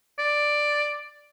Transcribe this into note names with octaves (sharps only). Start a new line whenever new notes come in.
D5